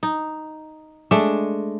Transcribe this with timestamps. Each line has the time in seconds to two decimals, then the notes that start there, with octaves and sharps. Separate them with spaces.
0.03 D#4
1.11 G#3 A3 D4